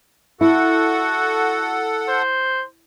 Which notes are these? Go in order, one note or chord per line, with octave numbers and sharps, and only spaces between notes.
E4 F#4 A4 F#5
C5